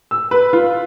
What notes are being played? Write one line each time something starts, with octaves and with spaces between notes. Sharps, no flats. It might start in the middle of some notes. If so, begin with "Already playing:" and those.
E6
B4
F4